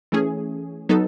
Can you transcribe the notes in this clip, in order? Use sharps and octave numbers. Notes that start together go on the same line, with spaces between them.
E3 A3 C#4 G#4
F#3 B3 D#4 A4